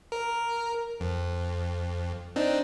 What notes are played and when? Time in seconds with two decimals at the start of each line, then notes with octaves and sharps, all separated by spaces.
0.12 A#4
1.00 F2
2.36 C4 D4 D#4